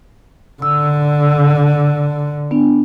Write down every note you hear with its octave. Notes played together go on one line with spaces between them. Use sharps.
D3 E6
B3 D4